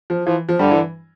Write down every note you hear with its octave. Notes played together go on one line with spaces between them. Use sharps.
F3
E3 F3
F3
G2 D3 G3
E3